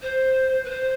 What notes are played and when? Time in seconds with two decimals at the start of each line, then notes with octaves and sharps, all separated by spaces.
0.01 C5
0.64 B4
0.69 C5